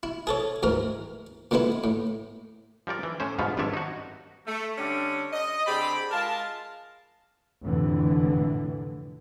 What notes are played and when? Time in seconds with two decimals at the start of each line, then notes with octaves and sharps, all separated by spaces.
0.03 E4
0.27 G#4 A4 C#5
0.63 D2 G#2 E3 A#4
1.51 A#2 D3 G#3 B3 E4
1.84 A2
2.87 F3 G3 A#4 D5
3.03 E3
3.20 A2 C#4 C5
3.38 G1 G#2 B2 F3 B3 F5
3.57 G#1 G2 F3 D4 C#5 E5
3.74 D#4 F#4
4.47 A3
4.78 D3 G3 C#4 D4
5.33 D#5
5.67 D3 C4 G4 G#4 D5 B5
6.11 G#3 F4 A#4 A5
7.63 F1 A2 D3 E3